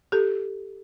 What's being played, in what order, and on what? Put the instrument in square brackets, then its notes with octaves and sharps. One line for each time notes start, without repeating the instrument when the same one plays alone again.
[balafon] G4 A4